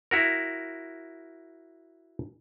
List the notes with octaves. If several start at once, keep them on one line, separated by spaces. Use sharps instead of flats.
E4 F#4 A#4